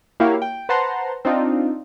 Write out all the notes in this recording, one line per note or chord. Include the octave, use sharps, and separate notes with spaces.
A#3 E4 F#4 G4 C#5 F5
G5
B4 C5 F#5 A5 A#5 C6
C4 D4 D#4 F4